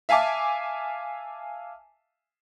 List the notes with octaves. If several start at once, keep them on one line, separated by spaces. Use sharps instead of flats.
E5 F5 G#5 A5 D6